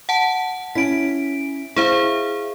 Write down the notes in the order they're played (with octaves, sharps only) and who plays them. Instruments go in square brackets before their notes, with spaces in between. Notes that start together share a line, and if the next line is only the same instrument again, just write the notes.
[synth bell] F#5 A5
[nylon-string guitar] C#4 E4 [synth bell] B6 D7
[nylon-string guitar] E4 E5 [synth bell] G#4 C5 F5